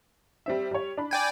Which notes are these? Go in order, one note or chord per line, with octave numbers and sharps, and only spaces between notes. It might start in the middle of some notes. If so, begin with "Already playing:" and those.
G3 C4 E5
G3 C#5
D4 B5
D5 G5 G#5